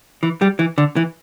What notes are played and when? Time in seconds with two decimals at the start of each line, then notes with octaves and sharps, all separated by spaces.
0.23 E3
0.41 G3
0.59 E3
0.78 D3
0.96 E3